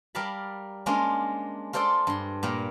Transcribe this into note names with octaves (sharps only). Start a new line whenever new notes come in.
G3 A#4 D5 F5 A5 B5
G#3 A#3 C#4 D4 F4
F4 A4 C5 D5 C6
G2 C6
A#2 G3 A#3